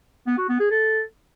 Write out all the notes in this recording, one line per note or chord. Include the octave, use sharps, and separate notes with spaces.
B3
F#4
B3
G#4
A4